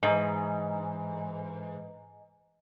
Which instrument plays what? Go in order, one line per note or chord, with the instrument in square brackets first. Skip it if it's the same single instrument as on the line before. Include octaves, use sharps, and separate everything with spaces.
[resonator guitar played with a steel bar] G#2 [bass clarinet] E3 [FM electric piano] D#5 G#5 A#5